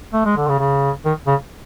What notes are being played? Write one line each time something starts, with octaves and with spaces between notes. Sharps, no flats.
A3
G#3
D3
C#3
C#3
D#3
C#3